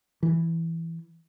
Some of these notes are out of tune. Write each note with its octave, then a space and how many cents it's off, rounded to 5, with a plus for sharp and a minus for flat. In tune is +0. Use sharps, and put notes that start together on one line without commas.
E3 +5